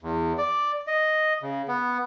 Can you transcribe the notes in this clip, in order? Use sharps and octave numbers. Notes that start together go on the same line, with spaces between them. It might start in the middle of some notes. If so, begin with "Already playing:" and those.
E2
D5
D#5
C#3
B3